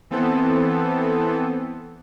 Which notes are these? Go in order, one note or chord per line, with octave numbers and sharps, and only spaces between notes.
E3 B3 C4 A4